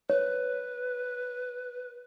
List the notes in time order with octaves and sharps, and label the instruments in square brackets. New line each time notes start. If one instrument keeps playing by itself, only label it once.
[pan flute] B4 [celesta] C#5